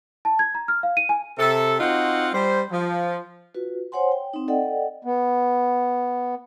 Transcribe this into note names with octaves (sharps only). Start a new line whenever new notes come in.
A5
G#6
A#5
F6
F5
D#7
G#5
C3 A4
C4 D#4 F4 F#4 F#5
G3 C5
F3
F4 F#4 B4
C5 C#5 F#5 G#5 C6
G5
C4 D#4
A4 D5 D#5 F#5 G5
B3